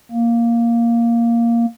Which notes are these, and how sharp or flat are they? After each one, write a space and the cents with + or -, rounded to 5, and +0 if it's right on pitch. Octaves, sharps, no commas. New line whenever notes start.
A#3 +0